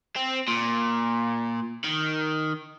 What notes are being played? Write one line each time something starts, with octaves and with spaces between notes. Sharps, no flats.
C4
A#2
D#3